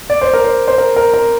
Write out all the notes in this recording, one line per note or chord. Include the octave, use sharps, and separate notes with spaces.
D5
C5
A#4
C5
C5
A#4
A#4
A#4